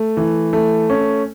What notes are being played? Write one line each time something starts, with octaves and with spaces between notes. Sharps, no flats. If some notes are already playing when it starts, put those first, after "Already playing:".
Already playing: A3
E3
A3
C#4